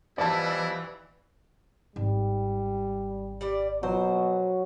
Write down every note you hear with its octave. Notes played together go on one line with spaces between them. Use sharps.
B2 E3 F3 G3 E4 D5 A5
G#1 G3
G3 D5
B2 F#3 C5